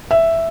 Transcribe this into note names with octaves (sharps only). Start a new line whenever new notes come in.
E5